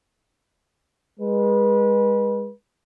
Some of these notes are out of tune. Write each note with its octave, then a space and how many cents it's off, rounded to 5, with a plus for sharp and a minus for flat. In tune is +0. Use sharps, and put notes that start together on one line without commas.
G#3 -25 B4 -30